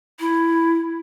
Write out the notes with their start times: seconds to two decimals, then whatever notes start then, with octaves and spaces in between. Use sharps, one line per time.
0.20 E4